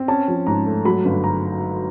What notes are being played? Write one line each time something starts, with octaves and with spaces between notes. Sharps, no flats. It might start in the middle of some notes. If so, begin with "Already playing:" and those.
Already playing: C4
C#4 A5
F3
G#2 A#5
A3
F#3 B5
G1
A#5